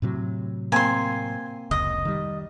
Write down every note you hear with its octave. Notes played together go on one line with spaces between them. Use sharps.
A2 C3 F#3
A#3 C4 G#5 C6
F1 C#2 D#5
D#3 G3